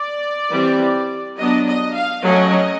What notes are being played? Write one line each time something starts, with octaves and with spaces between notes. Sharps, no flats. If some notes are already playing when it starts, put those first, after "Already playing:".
Already playing: D5
E3 G3 C4
F#3 B3 D4 D#5
D#5
F5
F#3 A3 C#4 D#5